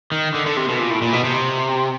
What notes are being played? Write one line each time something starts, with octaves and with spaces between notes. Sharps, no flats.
D#3
D3
D3
C3
B2
A#2
A2
A#2
B2
C3